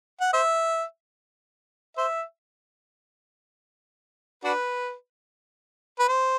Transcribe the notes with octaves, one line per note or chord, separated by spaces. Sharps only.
F#5
C5 E5
C5 E5
D4 F#4 B4
B4
C5